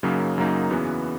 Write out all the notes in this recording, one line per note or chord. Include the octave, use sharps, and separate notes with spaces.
F#2 C#3 F#3 A#3 D#4
F#2 C#3 F#3 A#3 D#4
E2 C#3 E3 B3 F#4